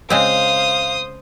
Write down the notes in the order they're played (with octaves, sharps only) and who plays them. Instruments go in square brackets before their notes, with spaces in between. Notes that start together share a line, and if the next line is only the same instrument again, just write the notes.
[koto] C#3 G#3 C4 [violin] C5 [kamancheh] F5 [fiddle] D#6